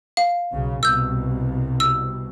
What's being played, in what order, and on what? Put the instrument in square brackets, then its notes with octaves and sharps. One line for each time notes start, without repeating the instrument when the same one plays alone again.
[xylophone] F5
[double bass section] B1 C#3
[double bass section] C2 B2 [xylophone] E6 G6
[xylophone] E6